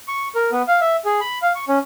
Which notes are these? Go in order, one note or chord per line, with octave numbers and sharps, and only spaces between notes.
C#6
A#4
B3
F5
E5
G#4
B5
F5
C#6
C#4